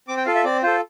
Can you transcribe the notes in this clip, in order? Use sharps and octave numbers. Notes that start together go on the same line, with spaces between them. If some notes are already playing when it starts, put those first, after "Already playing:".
C4 D6
G5
F4 A4 F5
E5
C4 D5
F4 A4 C5